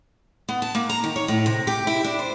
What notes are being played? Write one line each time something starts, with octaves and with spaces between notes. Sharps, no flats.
B3
A5
A#3
A#5
D#3
C#5
A2
C3
G4
E4
D4
C5